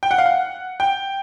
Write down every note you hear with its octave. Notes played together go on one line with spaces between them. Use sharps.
G5
F#5
F5
F#5
G5